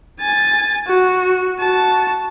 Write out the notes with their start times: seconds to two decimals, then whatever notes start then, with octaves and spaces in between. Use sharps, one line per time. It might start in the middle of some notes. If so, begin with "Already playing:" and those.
0.21 G#5 A6
0.87 F#4
1.59 F#4 A5